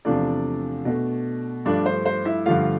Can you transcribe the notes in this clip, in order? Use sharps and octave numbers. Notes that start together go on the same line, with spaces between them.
E2 C3 F3 A3 D4 D5
B2 A3
G2 F3 A3 D4 D5
C5
C5
E4 E5
G2 D3 F3 A3 F4 F5